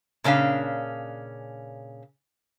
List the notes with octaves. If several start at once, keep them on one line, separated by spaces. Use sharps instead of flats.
A#2 C#3 C#4 D4 F5